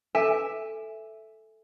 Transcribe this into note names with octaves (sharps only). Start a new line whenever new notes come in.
A4 E5 G#5